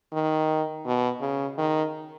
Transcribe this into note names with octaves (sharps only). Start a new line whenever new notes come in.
D#3
B2
C#3
D#3